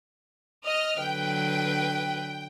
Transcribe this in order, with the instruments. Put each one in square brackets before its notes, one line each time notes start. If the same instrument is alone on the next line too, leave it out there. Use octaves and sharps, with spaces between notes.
[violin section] D#5 F6
[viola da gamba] D3 F#3 B4 [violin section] G5